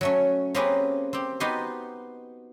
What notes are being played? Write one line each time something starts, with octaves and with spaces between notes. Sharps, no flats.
F#3 A3 C#4
A#3 C4 C#4 G4 G#4 B4
C4 G4
B3 D#4 F#4 G4 C5